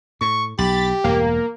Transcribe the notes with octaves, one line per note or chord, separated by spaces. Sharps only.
A2 C#6
B1 G4 B5 A6
E1 E2 G2 A#3